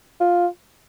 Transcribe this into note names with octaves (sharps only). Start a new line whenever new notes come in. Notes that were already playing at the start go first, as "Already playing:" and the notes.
F4